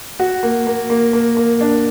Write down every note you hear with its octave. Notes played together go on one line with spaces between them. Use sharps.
F#4
A#3
A#3
A#3
A#3
A#3
D4